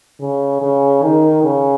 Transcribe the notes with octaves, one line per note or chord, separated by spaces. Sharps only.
C#3
C#3
D#3
C#3